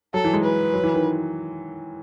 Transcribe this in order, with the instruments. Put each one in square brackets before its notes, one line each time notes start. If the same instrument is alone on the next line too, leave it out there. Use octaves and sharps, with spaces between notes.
[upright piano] F#3 [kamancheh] A4
[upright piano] E3
G#3
[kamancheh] B4
[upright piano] F#3
E3
D#3